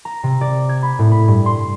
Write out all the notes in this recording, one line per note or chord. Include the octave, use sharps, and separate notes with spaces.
A#5
C3
D5
G#6
B5
A2
B5
G2
C6